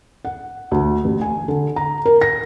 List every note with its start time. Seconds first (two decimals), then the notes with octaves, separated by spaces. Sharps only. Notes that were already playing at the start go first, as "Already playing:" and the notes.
0.25 F#5
0.71 D2
1.04 A1
1.21 G#5
1.48 D3
1.76 A#5
2.05 A#4
2.21 A#6